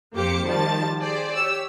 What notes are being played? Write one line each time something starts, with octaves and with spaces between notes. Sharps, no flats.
F2 A#3 G4 C5 D6 C#7
D#3 F3 G3 A5 A6
G4 G#4 C5 D5
G4 C#5 E6